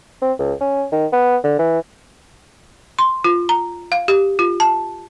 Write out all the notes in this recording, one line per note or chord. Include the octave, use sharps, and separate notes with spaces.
C4
C#2
C#4
D#3
B3
D3
E3
C6
F4
A#5
F5
G4
F4
A5